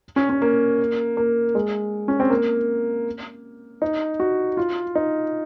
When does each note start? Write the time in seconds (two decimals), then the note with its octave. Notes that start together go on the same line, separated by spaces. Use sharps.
0.16 C#4
0.30 C#4
0.42 A#3
1.17 A#3
1.55 G#3
2.08 C#4
2.20 C4
2.30 A#3
3.82 D#4
4.20 F#4
4.57 F4
4.95 D#4